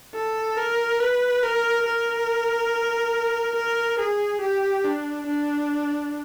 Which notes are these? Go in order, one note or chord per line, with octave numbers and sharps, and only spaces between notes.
A4
A#4
B4
A#4
A#4
A#4
G#4
G4
D4
D4